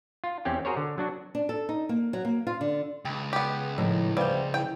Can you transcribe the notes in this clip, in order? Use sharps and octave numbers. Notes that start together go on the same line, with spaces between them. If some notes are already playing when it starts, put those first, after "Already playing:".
F4
E2 C4 C#4 G4
F#4 G#4 A#4 C5 C#5
D3
F#3 D4 F#4
D4
A4
D#4
A#3
F#3
A#3
F4
D3
C#2 G5
B3 G4
A2 D#3 F3
D2 G3 B4 C5 F5 G5
E3 G5